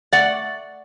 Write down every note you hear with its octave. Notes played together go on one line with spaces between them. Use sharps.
A3 D5 F#5